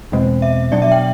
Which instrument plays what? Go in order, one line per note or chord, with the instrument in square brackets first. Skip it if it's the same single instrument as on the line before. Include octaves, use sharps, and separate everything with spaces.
[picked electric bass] E2 B2 G#3 C4
[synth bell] E5
[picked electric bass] B2 F#3 B3 D4 [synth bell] D5
[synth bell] E5
G5